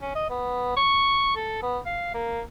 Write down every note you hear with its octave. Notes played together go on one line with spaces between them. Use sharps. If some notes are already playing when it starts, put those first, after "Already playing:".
C#4
D#5
B3
C#6
A4
B3
F5
A#3